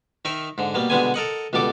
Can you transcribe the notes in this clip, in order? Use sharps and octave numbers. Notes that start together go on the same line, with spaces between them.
D#3 D#4 A#4 E5
G#2 D3
B2 G3 A#3
B2 D3 G3 G#3 B3 G#5
A4 A#4 D#5 F#5
C#2 B2 G3 A4 D6